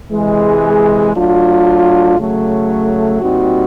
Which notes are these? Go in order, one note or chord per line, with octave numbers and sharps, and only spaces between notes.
C3 E3 G#3
F#3 A3 D4 F4
C#3 F#3 A3
A#2 G3 C4 D#4 F#4